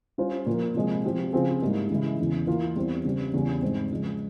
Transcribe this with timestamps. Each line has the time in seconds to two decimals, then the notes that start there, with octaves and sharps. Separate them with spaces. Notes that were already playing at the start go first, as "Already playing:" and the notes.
0.18 G3 C#4 F4 C5
0.46 A#2 F3 A#3
0.75 C3 F3 G#3
1.04 F3 C4 G4
1.33 C#3 F3 C4 F4 G#4
1.62 G#2 G3 A#3 E4
1.90 C#3 E3 G#3 E4
2.19 E2 C#3 E3
2.47 E3 A#3 F4
2.76 E2 E3 G3 C4
3.04 C#3 G3 C4
3.33 E2 C#3 G3 C#4
3.62 G#2 G3 C4
3.91 C#3 F3 G#3